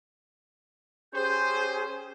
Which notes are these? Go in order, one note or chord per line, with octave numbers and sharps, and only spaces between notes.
C#4 G4 G#4 C5 G6